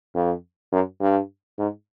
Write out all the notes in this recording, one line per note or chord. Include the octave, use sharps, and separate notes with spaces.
F2
F#2
G2
G#2